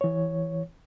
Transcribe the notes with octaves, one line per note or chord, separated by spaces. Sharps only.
E3 C#5